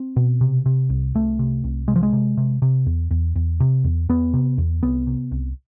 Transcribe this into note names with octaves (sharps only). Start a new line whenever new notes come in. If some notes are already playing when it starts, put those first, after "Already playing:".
Already playing: C4
B2
C3
C3
C2
C2 A3
C3
C2
C3 G#3
F3
G#3
C3
C3
C3
E2
E2
E2
C3
E2
E2 B3
C3
E2
C2 B3
C3
C2